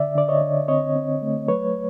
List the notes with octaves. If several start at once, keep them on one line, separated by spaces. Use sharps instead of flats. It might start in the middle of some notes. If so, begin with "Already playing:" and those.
Already playing: D3 D5 E5
D3 D5
C#5 D#5
D3
C4 C#5 D#5
C4
A3
F#3 B4 C#5